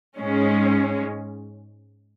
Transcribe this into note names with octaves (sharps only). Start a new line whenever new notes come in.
G#2 G#3 C#4